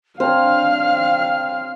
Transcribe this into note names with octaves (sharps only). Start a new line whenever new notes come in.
C4 D4 C5 C#5 F5 F6